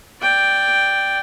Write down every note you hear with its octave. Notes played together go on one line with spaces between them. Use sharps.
D5 G5